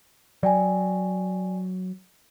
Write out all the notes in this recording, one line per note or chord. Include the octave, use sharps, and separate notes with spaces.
F#3 D5 G5 G#5